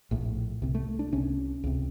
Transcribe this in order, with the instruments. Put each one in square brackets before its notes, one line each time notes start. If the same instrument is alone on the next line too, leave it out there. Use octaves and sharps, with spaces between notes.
[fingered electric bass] A#1 A2
C2 C3
A3
D4
C2 C3 C#4
C#2 C3